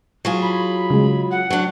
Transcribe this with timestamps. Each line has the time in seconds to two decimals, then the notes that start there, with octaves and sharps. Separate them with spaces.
0.25 F#3 F4 G#4
0.42 B5
0.90 C#3 G#3
1.31 F#5
1.50 F#3 D4